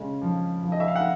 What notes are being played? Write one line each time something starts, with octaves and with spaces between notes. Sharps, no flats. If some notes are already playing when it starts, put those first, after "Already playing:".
Already playing: C#3 G#3
F3
F3
D#5
E5
F5
F#5